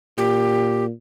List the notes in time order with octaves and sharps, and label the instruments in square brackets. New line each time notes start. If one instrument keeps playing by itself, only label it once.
[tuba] A#2 [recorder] G4